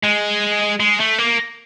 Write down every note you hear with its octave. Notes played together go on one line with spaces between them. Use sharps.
G#3
G#3
A3
A#3